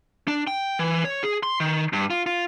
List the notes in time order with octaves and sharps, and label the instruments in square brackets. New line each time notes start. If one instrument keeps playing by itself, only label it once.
[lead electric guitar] D4
G5
E3
C#5
G#4
C6
D#3
G2
F4
F4